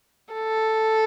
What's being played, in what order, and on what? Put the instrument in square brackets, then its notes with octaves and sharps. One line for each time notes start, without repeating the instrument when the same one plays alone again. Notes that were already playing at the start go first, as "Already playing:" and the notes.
[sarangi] A4